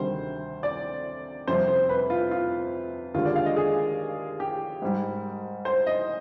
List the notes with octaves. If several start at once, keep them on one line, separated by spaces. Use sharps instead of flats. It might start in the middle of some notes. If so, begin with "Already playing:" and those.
Already playing: D2 C3 D#3 G3 C5
D5
F2 C3 G3 C5
C5
B4
F4
F4
D#2 D3 G#3 F4
D5
F5
D#5
G#4
G4
G#2 G3
C5
D#5